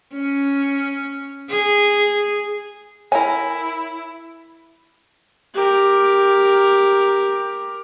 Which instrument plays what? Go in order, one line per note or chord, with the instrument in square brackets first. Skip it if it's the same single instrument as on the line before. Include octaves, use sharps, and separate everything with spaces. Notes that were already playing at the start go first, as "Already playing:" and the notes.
[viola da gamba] C#4
G#4
[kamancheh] E4 [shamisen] A#4 G#5 [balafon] C#5
[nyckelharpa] G4 A#4